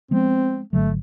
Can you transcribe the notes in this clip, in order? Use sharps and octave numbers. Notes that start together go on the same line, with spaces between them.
F3 G#3 B3 C4
G#1 D3 F#3 A3